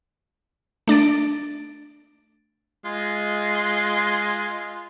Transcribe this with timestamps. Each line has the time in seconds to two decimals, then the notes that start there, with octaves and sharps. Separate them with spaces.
0.88 A3 D4 A6 D7
2.85 G#3 F4